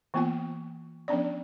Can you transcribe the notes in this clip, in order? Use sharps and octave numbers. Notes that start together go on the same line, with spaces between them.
E3 A#3 B3 F4 G#5
F3 B3 C#4 D4 D5